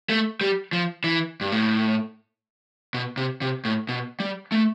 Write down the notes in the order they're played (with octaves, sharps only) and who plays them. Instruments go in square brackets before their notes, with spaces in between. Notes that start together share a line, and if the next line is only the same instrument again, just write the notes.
[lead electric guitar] A3
G3
F3
E3
G2
A2
B2
C3
C3
A2
B2
G3
A3